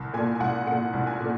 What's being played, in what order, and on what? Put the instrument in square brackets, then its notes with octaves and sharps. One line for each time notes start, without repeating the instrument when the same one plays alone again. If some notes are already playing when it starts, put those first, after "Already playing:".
Already playing: [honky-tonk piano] C2
A#2 G#5
G#5
C2 F#5
A#2 F#5
C2
G#5
A#2